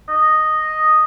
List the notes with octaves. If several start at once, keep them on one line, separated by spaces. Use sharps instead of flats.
D#5